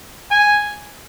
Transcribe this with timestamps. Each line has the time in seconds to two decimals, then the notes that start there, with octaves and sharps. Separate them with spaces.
0.31 G#5